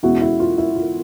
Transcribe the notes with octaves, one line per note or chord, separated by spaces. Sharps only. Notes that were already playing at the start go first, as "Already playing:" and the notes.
E2 B2 G#3 C#4 E4 F#4
E4
F4
E4
F4